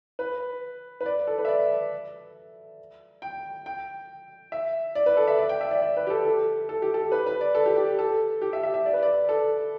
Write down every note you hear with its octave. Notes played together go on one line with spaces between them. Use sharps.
B4
B4
D5
A4
B4
E5
D5
G5
G5
E5
D5
B4
A4
E5
D5
G5
E5
D5
D5
B4
G4
A4
A4
A4
G4
A4
B4
B4
D5
A4
G4
G4
A4
G4
E5
E5
E5
D5
B4
D5
A4